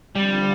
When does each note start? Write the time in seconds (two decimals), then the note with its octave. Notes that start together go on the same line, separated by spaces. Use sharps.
0.15 D3 F3 G3 C4 F4